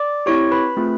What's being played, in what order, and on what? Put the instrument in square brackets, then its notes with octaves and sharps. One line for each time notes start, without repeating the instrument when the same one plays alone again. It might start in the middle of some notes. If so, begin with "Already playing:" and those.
Already playing: [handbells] D5 D6
C4 E4 G4 C#5 C#6
B4 B5
A3 C4 F4 G#4